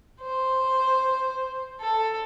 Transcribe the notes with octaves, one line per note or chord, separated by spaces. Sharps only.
C5
A4